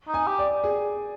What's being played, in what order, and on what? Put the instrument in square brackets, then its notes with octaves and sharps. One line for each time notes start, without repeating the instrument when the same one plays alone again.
[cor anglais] D#4
[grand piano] G#5
[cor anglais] G4
[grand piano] D5
G#4